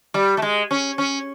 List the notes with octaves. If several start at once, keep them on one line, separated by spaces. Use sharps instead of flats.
G3
A3
G#3
C#4
C#4